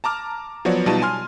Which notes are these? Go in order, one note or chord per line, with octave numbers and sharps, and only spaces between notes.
A5 A#5 D6 F6
F3 F#3 B3 F#4 C#5 D5
B2 G3 D#4 F4 A5 D#7
G#5 C6 F6